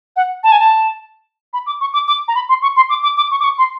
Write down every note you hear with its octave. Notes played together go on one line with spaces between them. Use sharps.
F#5
A5
G#5
A5
B5
D6
C#6
D6
D6
A#5
B5
C6
C#6
C6
D6
D6
D6
C#6
D6
C#6
C6